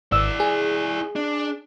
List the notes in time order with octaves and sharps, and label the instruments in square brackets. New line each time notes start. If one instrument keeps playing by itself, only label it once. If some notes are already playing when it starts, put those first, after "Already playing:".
[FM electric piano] G#1 E6 [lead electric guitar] E4 D5
[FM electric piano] G#4
[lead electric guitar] D4